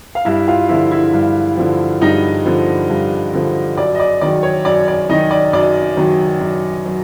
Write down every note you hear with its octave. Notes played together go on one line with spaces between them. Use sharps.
F5
G2 E4 E5
F4 F5
D3 F3 E4 E5
E4 E5
G2
D3 F3
G2 D#4 D#5
D3 F3
G2
D3 F3
F#2 D5
D#5
D5
D#3 F#3 D5
C#5
F#2 D5
D5
D#3 F#3 D#4 D#5
D5
F#2 D5
D#3 F#3
F#2
F#3